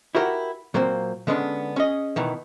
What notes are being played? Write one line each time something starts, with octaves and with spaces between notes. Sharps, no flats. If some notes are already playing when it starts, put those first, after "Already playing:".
E4 F#4 G4 A#4 F#5
A#2 F#3 A#3 C4
D3 G#3 B3 C#4 D4
C#4 G#4 D#5
B2 D#3 E3 B3